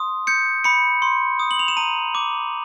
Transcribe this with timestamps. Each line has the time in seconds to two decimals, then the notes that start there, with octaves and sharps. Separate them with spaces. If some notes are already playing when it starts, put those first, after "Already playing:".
Already playing: C6 D#6
0.27 G6 C#7
0.64 B5 C#7
1.02 C6
1.39 D#6
1.51 F#7
1.59 F7
1.68 E7
1.77 A#5 D#7
2.15 D6